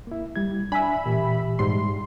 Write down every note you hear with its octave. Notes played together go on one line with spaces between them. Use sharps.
A#3 E4
G3 E4 G#6
D4 E5 G#5 B5
A#2 E3 G4
G#2 G3 C6